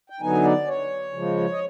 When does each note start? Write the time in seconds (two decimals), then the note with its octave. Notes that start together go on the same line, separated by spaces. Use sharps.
0.10 G5
0.20 D3 F#3 B3 D#4 G#5
0.44 D5
0.68 C#5
1.13 C#3 F3 G#3
1.52 D#5